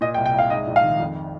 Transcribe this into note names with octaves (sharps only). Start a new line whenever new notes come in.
A#2 D#5
G5
C2
G5
C2 F5
G#2 D#5
A#1
F5
D#3
F2